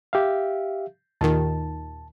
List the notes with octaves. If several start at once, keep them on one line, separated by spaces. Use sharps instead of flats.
G4 E5 F5
D#2 A#2 D#3 A5